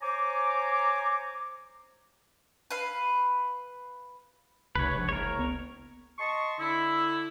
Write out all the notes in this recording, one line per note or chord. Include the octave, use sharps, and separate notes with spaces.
C5 C#5 G#5 A#5 D6
B4 F5
F1 C#2 B4 C#5
A#1
F#1 A#4 C#5
B3
D#5 A5 C6 C#6
D3 E4